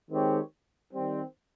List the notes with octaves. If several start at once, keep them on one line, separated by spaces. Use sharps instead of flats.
D#3 G#3 C4 G4 C#5
D#3 G3 C4